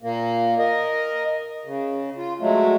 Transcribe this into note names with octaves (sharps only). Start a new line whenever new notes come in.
A#2 A#3
A#4 D#5
C#3
F4
F#3 G#3 A3